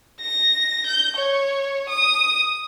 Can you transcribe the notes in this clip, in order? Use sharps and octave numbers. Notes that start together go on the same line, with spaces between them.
A#6
G6
C#5
D#6